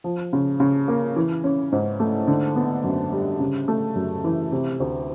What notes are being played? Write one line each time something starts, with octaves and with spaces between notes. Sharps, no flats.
F3
C#3
C#3
A#3
E3
C#4
G#2
A3
D3
B3
F#2
G3
C#3
A3
F#2
E3
C3
D2